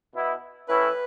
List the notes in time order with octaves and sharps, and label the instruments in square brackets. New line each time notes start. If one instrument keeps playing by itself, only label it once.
[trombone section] B2 B3 E4
[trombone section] A2 E3 C#4 E4 [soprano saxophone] B4